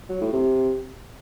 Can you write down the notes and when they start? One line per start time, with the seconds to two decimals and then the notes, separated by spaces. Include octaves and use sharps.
0.09 F#3
0.21 A2
0.33 C3